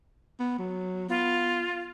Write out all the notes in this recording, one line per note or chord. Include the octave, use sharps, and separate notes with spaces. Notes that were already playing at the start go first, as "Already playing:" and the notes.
B3
F#3
B3 F4